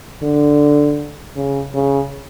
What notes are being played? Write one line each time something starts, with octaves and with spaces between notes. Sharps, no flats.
D3
C#3
C#3